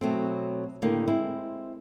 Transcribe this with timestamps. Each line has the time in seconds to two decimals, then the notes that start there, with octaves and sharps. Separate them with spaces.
0.01 B2 F#3 A3 C4
0.82 A2 D3 D#3 A#3 G4
1.08 G#3 C4 E4